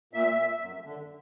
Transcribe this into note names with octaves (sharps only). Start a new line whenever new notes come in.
A#2 E5
F#2
D3